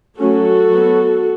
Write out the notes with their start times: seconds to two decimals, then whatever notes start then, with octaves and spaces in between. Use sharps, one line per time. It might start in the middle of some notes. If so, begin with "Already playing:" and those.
0.19 F#3 A3 C#4 F#4 A4
0.71 F#3 B3